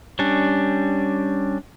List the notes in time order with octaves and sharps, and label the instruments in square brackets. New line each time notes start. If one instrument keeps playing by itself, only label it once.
[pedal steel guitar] G3 C#4 D4